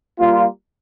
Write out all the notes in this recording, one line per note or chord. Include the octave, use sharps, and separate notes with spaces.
G3 A#3 F4